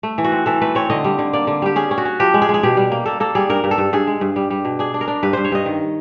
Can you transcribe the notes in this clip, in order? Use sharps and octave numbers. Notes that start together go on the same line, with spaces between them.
A3
E3
F#4
C4
E3 A4
A3 B4
C4 C#5
D3 D#5
G3
D3
A#3 D5
D3
G3 G4
C#4 G#4
C#4
F#4
C#4
F3 G4
G#3
G#4
G#3
G#4
B2 G4
G3
A#3
A#3 A4
A#3 A4
G3 G#4
G2 A#4
G2
A4
G2
G2 G#4
G#3
G2
G3
G3
B2
D4 G#4
D4
A#4
D4
G2 B4
G2 C5
C#5
G2 D#5
D#3